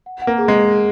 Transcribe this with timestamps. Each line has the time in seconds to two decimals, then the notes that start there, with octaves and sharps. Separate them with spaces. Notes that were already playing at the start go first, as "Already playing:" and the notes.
0.06 F#5
0.22 F#5
0.27 A#3
0.38 G#4
0.48 G#3
0.54 G#4
0.69 G#4